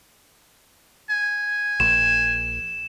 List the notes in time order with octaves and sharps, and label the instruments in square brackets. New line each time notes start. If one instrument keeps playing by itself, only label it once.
[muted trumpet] G#5
[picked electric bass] A#1 [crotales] E7